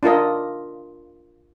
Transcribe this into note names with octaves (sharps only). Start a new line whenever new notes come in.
D4 F4 A#4 D#5